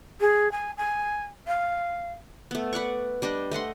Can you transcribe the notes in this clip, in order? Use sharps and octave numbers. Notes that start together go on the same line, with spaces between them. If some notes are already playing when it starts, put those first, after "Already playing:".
G#4
G#5
G#5
F5
A3 B3
B4 D5 F#5 C#6
G3 D4 G4 D#5
A3 D#5 F#5 C6